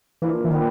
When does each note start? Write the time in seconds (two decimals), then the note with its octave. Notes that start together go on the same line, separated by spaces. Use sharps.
0.22 E3 F3 A#3 D4
0.45 E3
0.51 A#2 D#3 G3 B3